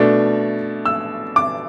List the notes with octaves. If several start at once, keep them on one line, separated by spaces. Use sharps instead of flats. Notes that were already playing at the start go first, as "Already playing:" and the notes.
Already playing: B2 A3 D4
E6
D6